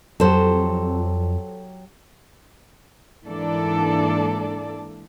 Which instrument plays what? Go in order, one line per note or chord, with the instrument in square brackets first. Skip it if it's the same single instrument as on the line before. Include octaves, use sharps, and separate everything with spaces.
[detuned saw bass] F2 [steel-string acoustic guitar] F#3 G4 [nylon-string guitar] A4 C5
[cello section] G#2 E3 A#3 D4 A4 D5